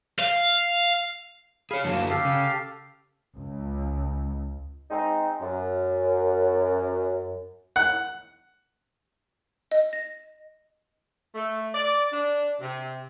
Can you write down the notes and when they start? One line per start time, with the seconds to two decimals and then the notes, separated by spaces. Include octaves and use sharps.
0.19 F5
1.71 G#4 C#5 F5 B5
1.84 F#2 D3 F#3 A#3 A5
2.10 G4 A4 F5
2.25 C#3
3.36 C#2
4.91 G#3 C4 D#4
5.41 F#2
7.76 F#5
9.72 D#5
9.93 A#6
11.35 A3
11.74 D5
12.12 D4
12.61 C3